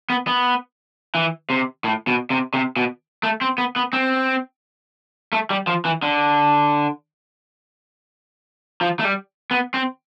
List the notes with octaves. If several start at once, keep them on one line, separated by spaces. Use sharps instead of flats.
B3
B3
E3
C3
A2
B2
C3
C3
B2
A3
C4
B3
B3
C4
A3
G3
F3
E3
D3
F3
A3
G3
B3
C4